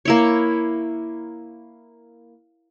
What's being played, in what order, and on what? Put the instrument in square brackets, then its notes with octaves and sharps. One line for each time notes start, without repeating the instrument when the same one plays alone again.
[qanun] A#3 E4 C#5